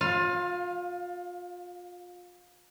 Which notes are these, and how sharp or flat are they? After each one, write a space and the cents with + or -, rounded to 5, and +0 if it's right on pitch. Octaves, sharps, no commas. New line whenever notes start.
F4 +30 F5 +0